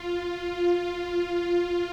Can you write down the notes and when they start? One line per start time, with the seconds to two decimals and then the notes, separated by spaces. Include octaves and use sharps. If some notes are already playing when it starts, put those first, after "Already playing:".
Already playing: F4
0.40 F4